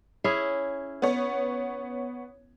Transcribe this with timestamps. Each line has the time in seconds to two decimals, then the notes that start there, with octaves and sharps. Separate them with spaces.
0.24 C#4 E4 G#4
1.02 B3 C#5